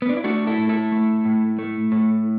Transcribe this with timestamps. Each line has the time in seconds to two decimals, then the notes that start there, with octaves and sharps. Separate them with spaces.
0.02 B3
0.09 D4
0.17 E4
0.24 A3 D4 F#4
0.47 E4 A4
0.58 A2
0.69 E4 A4
0.92 A3
1.25 A2
1.59 A3
1.92 A2